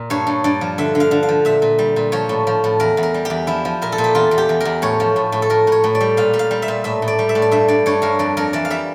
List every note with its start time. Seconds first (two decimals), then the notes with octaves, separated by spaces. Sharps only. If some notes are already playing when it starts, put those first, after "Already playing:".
Already playing: A#2 A#4
0.10 G2 C#5
0.27 G2
0.44 G2 D5
0.61 F3
0.78 D3 E5
0.95 D3
1.00 F5
1.11 D3
1.23 F5
1.29 F3
1.45 A#2 E5
1.62 A#2
1.79 G3
1.96 A#2
2.12 F3 C#5
2.29 A2
2.47 F3
2.64 A2
2.80 E2 A#4
2.97 E2
3.03 A#4
3.14 G3
3.25 E2 G4
3.47 F3 E4
3.65 F3
3.82 A#2 A#4
3.92 A4
3.98 A#2
4.04 G4
4.15 E2 F4
4.31 E2
4.38 G4
4.49 E2
4.60 E2 A#4
4.82 A2 C#5
5.00 F3
5.16 A2
5.32 A2
5.42 A4
5.50 A2 A#4
5.67 A2 C#5
5.84 A2
5.95 D5
6.01 G3
6.17 A#2 F5
6.34 G3
6.39 F5
6.51 G3
6.62 E5
6.68 A#2
6.84 A2 E5
7.02 A2
7.08 D5
7.19 G3
7.29 E5
7.35 A2
7.42 D5
7.51 G2 E5
7.68 G2 D5
7.86 G2 C#5
8.02 G2 A#4
8.19 F2 D5
8.37 F2 A#4
8.53 E3 D5
8.65 F5
8.70 G3 E5